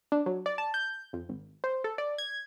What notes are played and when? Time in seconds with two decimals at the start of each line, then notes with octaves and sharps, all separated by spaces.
0.12 D4
0.26 F#3
0.46 D5
0.58 A5
0.74 G6
1.13 F2
1.29 G#1
1.64 C5
1.84 A4
1.98 D5
2.18 G#6